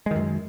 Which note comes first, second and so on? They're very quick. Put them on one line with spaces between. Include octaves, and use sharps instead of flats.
G#3 D#3 F#2